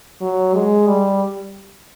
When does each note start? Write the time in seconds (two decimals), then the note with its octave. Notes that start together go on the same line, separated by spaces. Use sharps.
0.21 F#3
0.55 G#3
0.87 G3